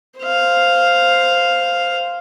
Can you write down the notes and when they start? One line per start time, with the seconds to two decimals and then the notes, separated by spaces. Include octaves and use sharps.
0.20 C5 F5